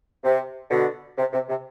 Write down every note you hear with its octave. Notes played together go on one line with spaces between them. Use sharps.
C3
B2 D3
C3
C3
C3